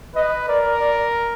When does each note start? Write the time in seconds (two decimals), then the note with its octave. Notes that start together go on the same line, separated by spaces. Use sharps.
0.15 B4 D#5
0.48 A#4 D5
0.80 D5